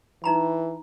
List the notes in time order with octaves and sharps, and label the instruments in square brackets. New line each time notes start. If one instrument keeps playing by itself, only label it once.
[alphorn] E3 [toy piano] D#4 A#5 B5